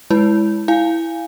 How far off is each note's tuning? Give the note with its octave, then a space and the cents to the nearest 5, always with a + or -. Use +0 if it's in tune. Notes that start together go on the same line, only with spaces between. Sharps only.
G#3 +0 E4 +0 B4 +10
E4 +0 F5 +0 G#5 -20